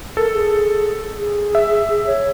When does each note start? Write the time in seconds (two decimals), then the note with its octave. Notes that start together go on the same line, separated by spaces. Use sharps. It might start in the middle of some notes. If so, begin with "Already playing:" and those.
0.17 A4 A#4
0.33 G#4
1.20 G#4
1.55 E5
2.07 C#5